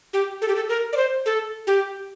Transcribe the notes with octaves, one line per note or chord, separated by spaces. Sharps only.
G4
A4
G4
A4
A#4
D5
C5
A4
G4